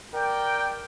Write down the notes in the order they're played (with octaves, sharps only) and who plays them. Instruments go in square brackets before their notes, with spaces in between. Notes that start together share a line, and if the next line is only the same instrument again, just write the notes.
[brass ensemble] A#4 D5 G5